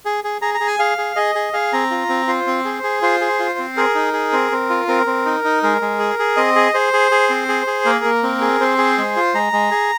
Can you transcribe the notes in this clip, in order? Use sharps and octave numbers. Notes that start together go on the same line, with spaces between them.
G#4
G#4
G#4 A#5
A#5
G#4
G#5
G#4 F5
G#4
G#4 D#5
G#4
G#4 F5
C4 A#5
F4
C4
F4 C5
C4
G#4
G#4
F4 C5
G#4
F4
C4
G#4 A#4
D#4
G#4
C4
C4
F4
C4 A#4
C4
D#4
D#4
G#3 A#4
G#3
G#4
G#4
C4 D#5
G#4
G#4 C5
G#4
G#4
C4
G#4
G#4
A#3 A#4
A#3
C4
G#4
C4 C5
G#4
G#3
F4
G#3 A#5
G#3
G#4